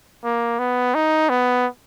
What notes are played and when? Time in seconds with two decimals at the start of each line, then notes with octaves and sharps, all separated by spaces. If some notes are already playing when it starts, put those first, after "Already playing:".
0.24 A#3
0.59 B3
0.95 D#4
1.29 B3